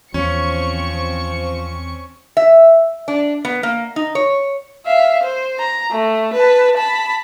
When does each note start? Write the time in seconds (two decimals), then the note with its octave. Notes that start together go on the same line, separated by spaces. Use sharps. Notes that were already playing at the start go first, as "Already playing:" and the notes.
0.14 E2 F3 C4 C#4 C#6 C#7
2.37 E5
3.08 D4
3.45 B3
3.63 A#3
3.96 D#4
4.15 C#5
4.86 E5 F5
5.23 C5
5.59 A#5
5.91 A3
6.33 B4 A5
6.77 A5 B5